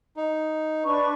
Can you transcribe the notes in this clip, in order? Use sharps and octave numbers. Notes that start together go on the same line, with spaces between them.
D#4
D4 B4 C#6